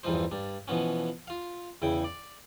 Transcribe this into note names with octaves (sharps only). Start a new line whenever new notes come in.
E2 G2 E3 F3 D#4 C5
G2 D4
B2 E3 F3 B3 C#4
F4 F5
E2 C#3 E4 G5
D5